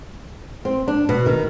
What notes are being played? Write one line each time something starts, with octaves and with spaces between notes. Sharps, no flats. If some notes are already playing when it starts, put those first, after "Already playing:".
C4
D4
B2
D#3